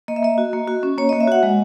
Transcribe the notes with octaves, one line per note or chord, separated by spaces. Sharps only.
A#3 D#5
E5
A#3 D#5
F#4
A#3
F#4
C#4
A#3 C#5
D#5
A#3
E5
F#4 F#5
G#3